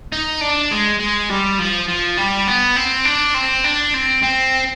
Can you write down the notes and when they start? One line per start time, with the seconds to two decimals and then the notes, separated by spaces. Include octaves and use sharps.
0.12 D#4
0.41 D4
0.71 G#3
1.00 G#3
1.29 G3
1.59 F3
1.88 F3
2.17 G3
2.47 B3
2.76 C4
3.05 D4
3.34 C4
3.64 D4
3.94 C4
4.23 C4